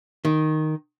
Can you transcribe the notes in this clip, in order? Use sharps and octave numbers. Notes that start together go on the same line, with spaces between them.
D#3